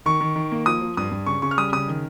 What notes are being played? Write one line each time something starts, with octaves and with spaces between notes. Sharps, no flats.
D#3 C#6
D#3
D#3
A#3
F3 D#6
F3
G2 D#6
G2
C#3 C#6
C#3 C#6
F6
G3 D#6
C#3 D#6
D#3